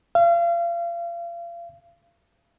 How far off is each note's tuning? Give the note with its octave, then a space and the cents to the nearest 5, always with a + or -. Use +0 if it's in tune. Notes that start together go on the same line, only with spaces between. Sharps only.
F5 -35